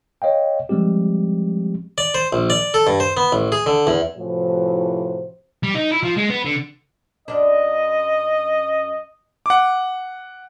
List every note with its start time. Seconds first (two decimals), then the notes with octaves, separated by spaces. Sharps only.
0.22 C#5 D#5 F5 G5
0.69 F3 G3 G#3 C4 G4
1.98 D5
2.14 C5
2.33 A#1
2.50 D5
2.74 A4
2.87 G2
3.00 C5
3.17 B3
3.32 A1
3.52 G#4
3.66 D3
3.87 E2
4.18 A2 C3 E3 F3 F#4 C5
5.63 G3
5.75 D#4
5.91 E4
6.03 F3
6.17 G#3
6.30 B3
6.45 D3
7.28 F#2 D4 D#5
9.46 F#5 D6